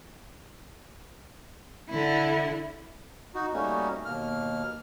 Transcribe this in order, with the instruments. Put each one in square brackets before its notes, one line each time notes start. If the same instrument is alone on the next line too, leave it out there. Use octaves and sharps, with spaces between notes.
[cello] D3 E4
[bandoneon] D#4 F#4
G3 A3 A#3 C#4 D#4 F#4
D#2 B2 A#3 F6